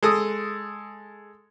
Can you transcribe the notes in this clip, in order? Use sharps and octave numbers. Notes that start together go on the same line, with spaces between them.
G#3 A4 D#6